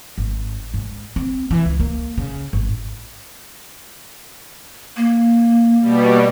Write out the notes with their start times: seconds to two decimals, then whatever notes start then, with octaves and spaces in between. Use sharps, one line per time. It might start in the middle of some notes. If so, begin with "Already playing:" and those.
0.18 G#1
0.74 G#2
1.16 C4
1.51 E3
1.66 C#2
1.80 A#3
2.18 C#3
2.53 G#1
4.97 A#3
5.81 B2 G3